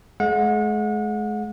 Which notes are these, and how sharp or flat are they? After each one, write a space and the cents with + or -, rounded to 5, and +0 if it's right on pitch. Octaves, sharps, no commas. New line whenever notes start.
G#3 +40 F#5 -35